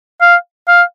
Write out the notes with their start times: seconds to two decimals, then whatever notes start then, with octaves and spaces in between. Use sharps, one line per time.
0.21 F5
0.68 F5